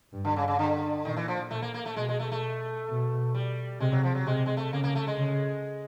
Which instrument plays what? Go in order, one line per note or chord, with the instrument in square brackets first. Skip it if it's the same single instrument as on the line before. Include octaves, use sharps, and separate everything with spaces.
[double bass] G2
[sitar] D3
C#3
C#3
D3
[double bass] A#2 [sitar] D#3
[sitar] E3
F3
[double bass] A#2 [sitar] A3
[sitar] A#3
A#3
A3
[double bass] B2 [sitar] G#3
[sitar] G#3
A3
A3
[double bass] B2
[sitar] G3
[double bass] C3 [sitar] G#3
[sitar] F#3
F3
F#3
[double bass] C3 [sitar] G#3
[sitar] G#3
A3
[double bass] C#3 [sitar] A#3
[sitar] A#3
A3
G#3
[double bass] C#3